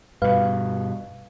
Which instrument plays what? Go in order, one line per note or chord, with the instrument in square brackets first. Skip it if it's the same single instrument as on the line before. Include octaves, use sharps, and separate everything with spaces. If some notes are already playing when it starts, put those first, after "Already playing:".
[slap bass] G2 B2 [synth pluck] B4 F5